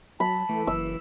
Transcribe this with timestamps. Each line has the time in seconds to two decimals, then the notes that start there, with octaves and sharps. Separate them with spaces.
0.20 F#3 A5 B5
0.49 E3 A3
0.67 F#1 E6